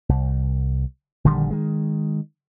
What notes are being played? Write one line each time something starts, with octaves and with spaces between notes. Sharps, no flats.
C2
A#1 D3 D#3 G3
D#3 G#3